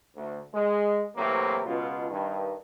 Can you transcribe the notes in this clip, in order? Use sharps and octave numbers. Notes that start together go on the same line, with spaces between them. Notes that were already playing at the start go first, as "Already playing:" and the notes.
D2
G#3
A2 C3 E3 F#3 A#3 C4
C#2 B2 F4
G2 D#3